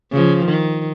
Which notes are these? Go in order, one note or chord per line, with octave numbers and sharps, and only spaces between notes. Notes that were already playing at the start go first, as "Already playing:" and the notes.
C#3 F3
D#3